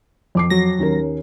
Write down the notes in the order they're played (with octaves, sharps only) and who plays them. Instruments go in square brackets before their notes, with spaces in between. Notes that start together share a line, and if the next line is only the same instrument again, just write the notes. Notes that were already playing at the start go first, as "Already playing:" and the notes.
[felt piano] F2 D6 C7
[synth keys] F#3 A#6
[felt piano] D#2 C#4 A#4